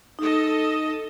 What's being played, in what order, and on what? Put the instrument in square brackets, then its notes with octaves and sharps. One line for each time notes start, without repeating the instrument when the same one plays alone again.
[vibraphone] D#4 [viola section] A4 D#5